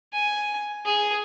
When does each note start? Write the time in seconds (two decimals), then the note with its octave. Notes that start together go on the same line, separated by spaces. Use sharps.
0.13 G#5
0.85 G#4